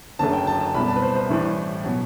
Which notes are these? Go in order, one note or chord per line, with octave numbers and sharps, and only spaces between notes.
F#1 F#2 D3 F#3 A3 A5
G5
A5
A5
C2 B2 G3 B5
A5
B4
C5
C5
A1 A2 E3 G3
B2 F#3